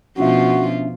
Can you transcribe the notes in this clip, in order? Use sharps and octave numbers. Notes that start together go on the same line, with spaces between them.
B2 F3 C#4 D4 F4 F#4 E5